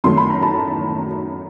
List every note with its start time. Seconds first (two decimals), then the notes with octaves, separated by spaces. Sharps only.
0.04 F#2 D#3 F#3 A3 C6
0.18 B5
0.30 A#5
0.42 A5 B5